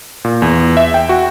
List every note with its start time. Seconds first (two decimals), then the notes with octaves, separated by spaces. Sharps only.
0.25 A#2
0.42 E2
0.77 E5
0.94 G5
1.09 F#4